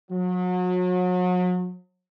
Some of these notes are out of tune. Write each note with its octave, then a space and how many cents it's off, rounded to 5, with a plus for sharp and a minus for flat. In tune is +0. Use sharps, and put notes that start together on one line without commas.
F#3 -35